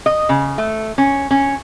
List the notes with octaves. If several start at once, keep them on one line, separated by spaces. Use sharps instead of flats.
D#5
C#3
A3
C#4
C#4